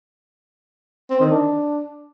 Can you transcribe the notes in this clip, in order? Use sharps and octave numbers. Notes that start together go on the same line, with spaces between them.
C4
D#3
D4